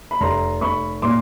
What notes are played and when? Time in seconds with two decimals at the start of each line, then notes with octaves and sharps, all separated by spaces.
0.11 B5
0.21 F1 A#5 C6
0.61 F1 B5 C#6
1.02 A#2 C6 D6